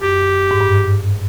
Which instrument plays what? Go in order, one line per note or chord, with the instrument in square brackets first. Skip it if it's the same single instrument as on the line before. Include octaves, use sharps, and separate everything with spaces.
[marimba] F#2 [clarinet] G4
[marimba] G#2
G2